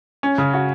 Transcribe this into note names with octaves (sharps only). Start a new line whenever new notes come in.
C#4
C#3
F#4